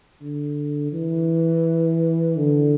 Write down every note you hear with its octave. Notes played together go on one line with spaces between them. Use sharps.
D3
E3
D3